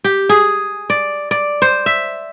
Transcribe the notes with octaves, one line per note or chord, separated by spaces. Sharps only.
G4
G#4
D5
D5
C5
E5